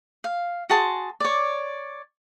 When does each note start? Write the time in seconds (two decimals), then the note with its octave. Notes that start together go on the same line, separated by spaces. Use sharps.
0.24 F5
0.70 F#4 G#4 A5 C6
1.20 C#5 D5